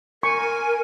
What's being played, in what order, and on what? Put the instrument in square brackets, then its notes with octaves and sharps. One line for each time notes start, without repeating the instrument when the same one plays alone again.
[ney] A#4 [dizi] G#5 [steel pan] C#6